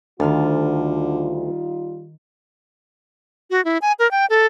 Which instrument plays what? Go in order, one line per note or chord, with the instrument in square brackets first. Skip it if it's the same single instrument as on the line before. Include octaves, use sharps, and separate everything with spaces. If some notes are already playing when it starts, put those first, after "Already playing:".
[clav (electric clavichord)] D2 [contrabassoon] D3 [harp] D#3 F6 A6 [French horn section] G3 D#4 F4
[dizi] F#4
E4
G#5
A#4
G5
A4